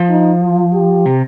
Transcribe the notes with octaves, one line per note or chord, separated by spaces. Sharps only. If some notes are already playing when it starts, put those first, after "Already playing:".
Already playing: F3
D#4
F4
G4
C3